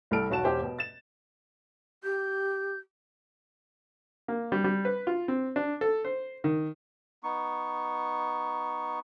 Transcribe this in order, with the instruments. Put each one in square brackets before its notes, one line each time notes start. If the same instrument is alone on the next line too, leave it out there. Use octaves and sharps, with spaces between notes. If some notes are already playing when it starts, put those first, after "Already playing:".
[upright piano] C2 G3 A4 F6 D7
E1 B1 F#4 A5 E7
E1 G4 C5
B2
A6 E7
[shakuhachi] G4 [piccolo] G6
[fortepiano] A#3
G3
G3
B4
F4
C4
D4
A4
C5
D#3
[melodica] B3 D#4 C#6